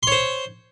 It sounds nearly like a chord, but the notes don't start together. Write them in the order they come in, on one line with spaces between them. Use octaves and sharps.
C6 C#5 C5